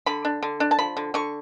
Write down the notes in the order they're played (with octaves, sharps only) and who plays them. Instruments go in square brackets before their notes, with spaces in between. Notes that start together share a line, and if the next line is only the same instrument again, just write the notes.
[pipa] D3 B5
D4
D3
D4
A5
F3 B5
D3
D3 C#6